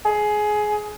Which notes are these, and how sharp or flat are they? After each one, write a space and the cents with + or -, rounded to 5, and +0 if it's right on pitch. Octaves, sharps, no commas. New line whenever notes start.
G#4 +15